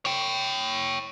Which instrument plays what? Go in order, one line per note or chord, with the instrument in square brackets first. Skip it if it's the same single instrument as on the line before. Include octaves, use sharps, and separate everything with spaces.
[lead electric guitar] C#5 G5